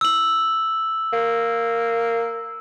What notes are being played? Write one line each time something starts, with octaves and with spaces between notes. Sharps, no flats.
E6 F#7
A#3